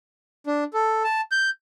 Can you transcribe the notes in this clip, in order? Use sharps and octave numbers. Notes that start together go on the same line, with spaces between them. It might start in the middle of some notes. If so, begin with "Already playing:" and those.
D4
A4
A5
G6